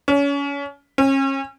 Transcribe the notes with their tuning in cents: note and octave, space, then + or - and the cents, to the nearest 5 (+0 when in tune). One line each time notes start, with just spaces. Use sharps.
C#4 +30
C#4 -35